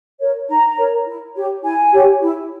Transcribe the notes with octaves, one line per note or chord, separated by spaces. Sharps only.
A#4 C#5
D#4 A#5
A#4 C#5
E4
G4 C#5
E4 G#5
G4 C#5
E4